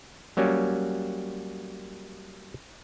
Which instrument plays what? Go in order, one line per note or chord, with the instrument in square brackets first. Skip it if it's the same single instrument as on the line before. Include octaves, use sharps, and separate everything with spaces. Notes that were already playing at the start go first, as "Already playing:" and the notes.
[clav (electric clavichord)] F#3 G3 A#3 C#4